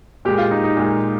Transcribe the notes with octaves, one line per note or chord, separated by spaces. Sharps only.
A#2 G#3 G4
F4
D#4
D#4
A#2 G#3